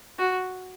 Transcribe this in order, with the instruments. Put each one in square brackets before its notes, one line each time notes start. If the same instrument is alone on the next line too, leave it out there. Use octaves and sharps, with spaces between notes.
[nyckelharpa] F#4